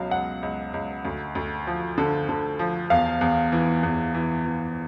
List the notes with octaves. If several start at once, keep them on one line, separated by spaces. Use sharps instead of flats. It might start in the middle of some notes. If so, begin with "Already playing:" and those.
Already playing: C#2 B2 F#3 F5
C#2 F#5
C#2
C#2
D2
D2
F3
D3
D3
F3
E2 F5
E2
E3
E2
E3
E3